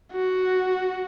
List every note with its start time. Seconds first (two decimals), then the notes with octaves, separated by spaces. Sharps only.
0.12 F#4